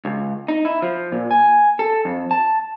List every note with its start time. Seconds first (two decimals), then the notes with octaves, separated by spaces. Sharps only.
0.05 C#2
0.48 D#4
0.65 E4
0.82 F3
1.12 A#2
1.31 G#5
1.79 A4
2.05 F2
2.31 A5